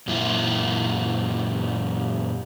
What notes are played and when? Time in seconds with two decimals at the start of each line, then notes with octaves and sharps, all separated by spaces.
0.08 F#2 A#2 E4 F4